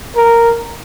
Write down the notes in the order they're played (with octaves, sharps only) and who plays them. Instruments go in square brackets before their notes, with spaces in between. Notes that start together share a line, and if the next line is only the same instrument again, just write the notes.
[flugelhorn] A#4